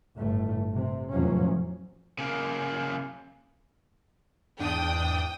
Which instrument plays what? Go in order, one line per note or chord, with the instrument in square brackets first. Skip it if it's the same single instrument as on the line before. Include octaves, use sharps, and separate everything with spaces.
[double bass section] G1 A2 A3
C3
F1 E2 A2 F3 F#3 C#4
[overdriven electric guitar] C#3 A#3
[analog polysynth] E2 G#2 D4 [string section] G5 D#6